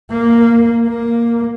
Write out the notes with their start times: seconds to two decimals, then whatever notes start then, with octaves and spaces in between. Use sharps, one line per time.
0.11 A#3
0.88 A#3